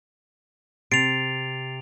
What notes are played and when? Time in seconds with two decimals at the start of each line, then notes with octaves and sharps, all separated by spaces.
0.92 C3 A6 C7 D7 F7